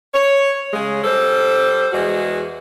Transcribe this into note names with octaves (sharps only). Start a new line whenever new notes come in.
C#5
C#3 G#3
G3 A4 C5
E2 G#3 F#4 G#4